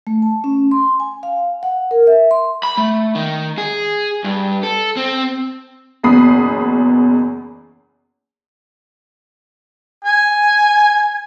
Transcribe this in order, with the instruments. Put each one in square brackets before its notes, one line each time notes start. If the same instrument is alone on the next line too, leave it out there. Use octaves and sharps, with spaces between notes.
[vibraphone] A3
A5
C#4
C6
G#5
F5
F#5
A#4
E5
C6
[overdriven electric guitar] B5
A3
D#3
G#4
G2
A4
C4
[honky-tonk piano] F#1 E2 B2 B5 D#6 C7
[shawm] G#5